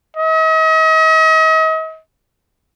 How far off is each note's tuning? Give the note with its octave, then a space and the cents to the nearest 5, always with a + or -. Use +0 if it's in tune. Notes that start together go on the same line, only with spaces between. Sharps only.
D#5 +40